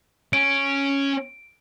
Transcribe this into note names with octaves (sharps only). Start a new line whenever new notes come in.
C#4 D7